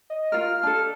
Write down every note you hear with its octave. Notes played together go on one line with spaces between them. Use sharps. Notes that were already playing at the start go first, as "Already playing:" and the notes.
D#5
F4 A#4 F6
D4 A4 A5